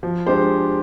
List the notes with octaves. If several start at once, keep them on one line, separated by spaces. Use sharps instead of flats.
F3
G#3 D4 G4 C5